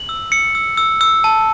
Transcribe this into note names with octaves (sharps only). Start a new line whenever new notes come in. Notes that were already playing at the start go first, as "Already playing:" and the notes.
Already playing: F#7
E6
E6 C#7
E6
E6
E6
A5